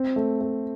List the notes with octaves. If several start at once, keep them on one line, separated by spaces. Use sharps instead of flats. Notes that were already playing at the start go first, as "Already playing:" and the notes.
Already playing: C4
A3
A3